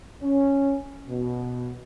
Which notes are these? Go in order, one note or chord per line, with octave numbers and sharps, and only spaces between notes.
C#4
B2